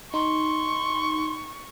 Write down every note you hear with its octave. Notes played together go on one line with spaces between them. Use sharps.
D#4 C6 C#6